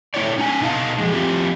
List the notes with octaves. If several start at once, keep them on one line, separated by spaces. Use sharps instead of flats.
A3 E4 C#5 D5
C#4 D#4 G#5
B2 D#4 F4 F5 A5
F3 G3 G#3
F3 C4 E4 F4 G4